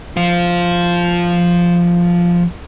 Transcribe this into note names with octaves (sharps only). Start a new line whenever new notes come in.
F3 F4